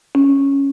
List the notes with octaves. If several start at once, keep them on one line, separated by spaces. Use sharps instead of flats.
C#4